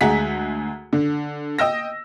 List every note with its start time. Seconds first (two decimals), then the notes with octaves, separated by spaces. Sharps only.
0.01 D2 G#3 G#4 F#5 A#5 B6
0.93 D3
1.59 D#5 G5 E6 A#6